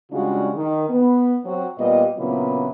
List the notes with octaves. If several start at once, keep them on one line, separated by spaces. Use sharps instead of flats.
C#3 G3 G#3 D4 F4 F#4
D#3
B3
F#3 C4 F#4
A#2 G3 B3 D#5
A#2 C#3 F#3 B3 C4 E4